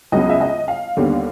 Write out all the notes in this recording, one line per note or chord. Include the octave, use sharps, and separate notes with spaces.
C#2 C#3 F#3 B3 D#5
E5
D#5
F5
D#2 D3 G3 B3